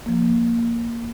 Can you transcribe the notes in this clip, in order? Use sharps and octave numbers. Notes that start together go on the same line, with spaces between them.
F3 A#3